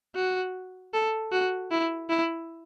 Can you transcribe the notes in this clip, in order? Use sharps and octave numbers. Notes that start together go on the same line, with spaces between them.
F#4
A4
F#4
E4
E4